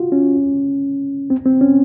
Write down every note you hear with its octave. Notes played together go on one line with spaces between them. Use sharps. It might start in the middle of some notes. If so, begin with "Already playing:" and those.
Already playing: F4 F#4
C#4
C4
C4
C#4